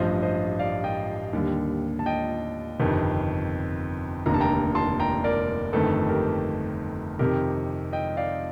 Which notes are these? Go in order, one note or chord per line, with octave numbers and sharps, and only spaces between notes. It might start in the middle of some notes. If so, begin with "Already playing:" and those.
Already playing: A1 G2 F3 C5 D#5
C5 D#5
D5 F5
D#5 G5
D#2 D3 G3
A5
D#5 G5
G1 F2 C3 D#3
F1 D#2 D3 A#5
A5
G5 A#5
A5 C6
G5 A#5
A#4 D5
G1 F2 D#3 A3 A4
G4 A#4
F2 C3 D#3 G4 A#4
D#5 G5
D5 F5